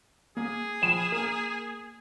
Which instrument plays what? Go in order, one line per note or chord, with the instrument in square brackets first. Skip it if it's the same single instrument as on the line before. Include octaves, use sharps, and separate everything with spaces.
[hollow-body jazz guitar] A#3 [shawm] G#4
[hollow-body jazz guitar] F3 G5 B5 [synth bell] E7
[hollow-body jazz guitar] A#3 A#4